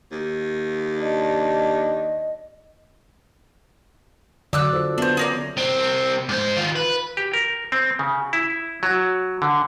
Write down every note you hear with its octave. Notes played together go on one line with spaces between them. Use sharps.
D#2
D4 D#5
D3 F#3 D5 D6 E6 F#6
F4 A4 C5
B3 D4 C5 E5
C#4 G#4 A#4 D5
C2 C4
G#2 C5
D#3 F4
B4
G4
A#4
C4
C#3
E4
F#3
D3